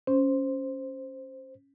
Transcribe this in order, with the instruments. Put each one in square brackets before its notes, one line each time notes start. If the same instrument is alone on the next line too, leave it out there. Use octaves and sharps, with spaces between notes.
[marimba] C#4 [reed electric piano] C5